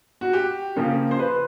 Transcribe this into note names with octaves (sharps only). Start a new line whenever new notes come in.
F#4
G4
C#3 F3 A#3 C#4
C5
B4